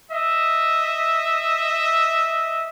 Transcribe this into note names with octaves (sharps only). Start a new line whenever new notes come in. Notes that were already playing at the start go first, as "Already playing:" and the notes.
D#5 E5